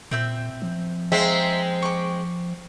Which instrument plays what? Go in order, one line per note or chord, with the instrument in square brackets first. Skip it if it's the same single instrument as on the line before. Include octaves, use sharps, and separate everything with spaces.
[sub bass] A#2 [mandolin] C4 E5 G6
[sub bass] F3
[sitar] G#3 C4 [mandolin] E5 F5 A#5
[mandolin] C#6 D6